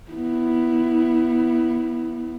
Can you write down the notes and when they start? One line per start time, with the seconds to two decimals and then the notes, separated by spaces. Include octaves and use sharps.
0.11 B3 E4